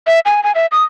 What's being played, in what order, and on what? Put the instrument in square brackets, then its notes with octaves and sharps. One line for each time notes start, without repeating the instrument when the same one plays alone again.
[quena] E5
G#5
G#5
E5
D#6